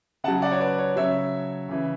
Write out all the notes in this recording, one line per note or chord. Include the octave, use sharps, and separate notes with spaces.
C#3 F#3 F#5 A5
D5 F#5
C#5
B4 D5
C#5
C#3 F#3 C#5 E5
C#3 E3